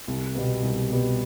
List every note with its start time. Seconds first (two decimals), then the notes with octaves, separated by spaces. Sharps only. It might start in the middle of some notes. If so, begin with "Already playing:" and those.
0.08 C2
0.35 B2 G3 B3
0.62 C2
0.90 B2 G3 B3